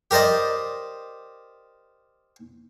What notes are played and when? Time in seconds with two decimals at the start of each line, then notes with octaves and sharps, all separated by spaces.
0.11 G4 A#4 C5 D5 D#5